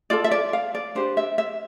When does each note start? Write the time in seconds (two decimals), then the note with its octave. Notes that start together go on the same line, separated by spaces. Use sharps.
0.10 F4 A4 D5
0.24 E5
0.31 D5
0.53 F5
0.75 D5
0.95 D4 G4 B4 C5
1.17 E5
1.38 E5